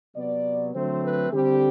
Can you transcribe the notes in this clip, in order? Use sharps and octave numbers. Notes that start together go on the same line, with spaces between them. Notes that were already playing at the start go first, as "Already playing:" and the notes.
C3 F#3 B3 D5
D3 F#3 A3 C4 C5
B4
D3 G3 C4 G4